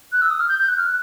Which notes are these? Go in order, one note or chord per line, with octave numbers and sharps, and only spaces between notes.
F#6
E6
D#6
F6
G6
G6
F#6
F6
F#6